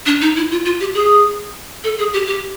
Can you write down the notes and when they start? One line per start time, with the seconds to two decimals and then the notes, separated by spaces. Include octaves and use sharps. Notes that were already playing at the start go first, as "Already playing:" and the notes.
0.06 D4
0.21 D#4
0.36 E4
0.51 F4
0.65 F4
0.80 G4
0.94 G#4
1.84 A4
1.98 G#4
2.13 G4
2.27 G4